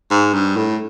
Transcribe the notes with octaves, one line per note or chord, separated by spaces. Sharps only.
G#2
G2
A2